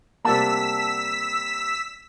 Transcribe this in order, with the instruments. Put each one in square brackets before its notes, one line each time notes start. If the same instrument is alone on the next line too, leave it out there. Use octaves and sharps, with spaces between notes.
[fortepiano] C3 G3 A#3 [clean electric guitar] D5 F#5 A5 [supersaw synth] E6 B6